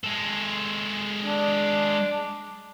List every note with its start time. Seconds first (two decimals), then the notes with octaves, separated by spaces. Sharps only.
0.04 G#3 A4
1.26 D4